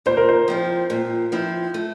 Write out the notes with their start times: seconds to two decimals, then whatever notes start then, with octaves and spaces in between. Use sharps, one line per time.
0.06 A#2 C5
0.17 A#4
0.29 C5
0.48 F3 C4 E4
0.90 A#2
1.32 F3 C4 E4
1.74 A3